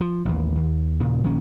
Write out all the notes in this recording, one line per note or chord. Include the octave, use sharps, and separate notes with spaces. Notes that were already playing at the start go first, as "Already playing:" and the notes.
F3
A1 D#2
D#2
D#2 A#2 C#3
A#1 D#3 A#3 C#4